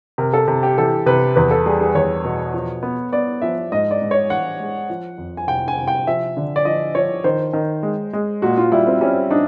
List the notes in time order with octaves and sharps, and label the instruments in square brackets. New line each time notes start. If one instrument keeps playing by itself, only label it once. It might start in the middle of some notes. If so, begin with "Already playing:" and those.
[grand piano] C3 [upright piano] A#4
[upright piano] A4
[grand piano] C3
[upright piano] G4
[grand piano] E3 [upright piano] A4
[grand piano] C3 [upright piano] B4
[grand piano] E2 [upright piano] B4
[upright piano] A4
[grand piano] G3 [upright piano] G#4
[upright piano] G#4
[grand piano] E2 [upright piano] C#5
[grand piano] B2
F3
B3
[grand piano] B3 [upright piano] D5
[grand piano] F3 [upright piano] E5
[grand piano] G#2 [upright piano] D#5
[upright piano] D5
[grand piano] G#2
[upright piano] C#5
[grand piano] E3 [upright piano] F#5
[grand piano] G#3
F3
F2
[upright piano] G#5
[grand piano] C3 [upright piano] G5
[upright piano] G#5
[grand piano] C3
[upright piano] G5
[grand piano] F3 [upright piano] E5
[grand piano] D3
[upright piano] D5
[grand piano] F3 [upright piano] D#5
[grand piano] F3 [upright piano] C#5
[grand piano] D#3 [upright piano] C5
[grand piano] D#3
G#3
G#3
[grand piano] A#2 [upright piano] F#4
[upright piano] F4
[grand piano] G3 [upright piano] E4
[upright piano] C4
[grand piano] G3 [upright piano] C#4
[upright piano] D4 [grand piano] D#4